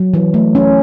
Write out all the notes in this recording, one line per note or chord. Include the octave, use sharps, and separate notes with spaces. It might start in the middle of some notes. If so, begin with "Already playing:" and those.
Already playing: F#3
E3
A3
C#4